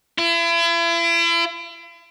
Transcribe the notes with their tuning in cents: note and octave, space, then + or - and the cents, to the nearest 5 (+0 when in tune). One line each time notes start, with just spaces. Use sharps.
E4 +40